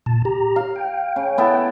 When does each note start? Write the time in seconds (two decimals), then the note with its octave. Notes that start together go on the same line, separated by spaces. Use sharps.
0.06 A#2 A5
0.25 G4 A#5
0.56 F5
0.76 G5
1.16 C#3
1.38 B3 E4 A4